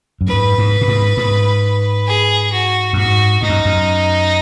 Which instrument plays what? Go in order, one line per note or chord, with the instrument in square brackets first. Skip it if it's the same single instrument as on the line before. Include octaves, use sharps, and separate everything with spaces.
[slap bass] F#2
[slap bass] G#2 [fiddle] B4
[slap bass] G#2
B2
G#2
G#2
[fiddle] G#4
F#4
[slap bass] F#2
[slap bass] G#2 [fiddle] F#4
[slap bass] G#2 [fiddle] D#4
[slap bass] F#2
F#2